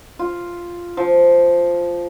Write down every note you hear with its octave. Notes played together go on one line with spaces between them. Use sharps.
F4
F3